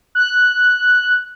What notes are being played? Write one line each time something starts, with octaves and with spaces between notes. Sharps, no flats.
F#6